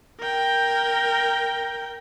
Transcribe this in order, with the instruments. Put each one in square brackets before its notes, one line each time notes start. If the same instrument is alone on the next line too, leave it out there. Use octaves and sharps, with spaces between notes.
[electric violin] A#4 G5